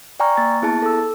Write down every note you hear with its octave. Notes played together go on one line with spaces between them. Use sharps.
D5 G5 G#5 A#5 C#6 F6
A#3 A6
B3 E4 G#4 A5 A6
A4 E6
A4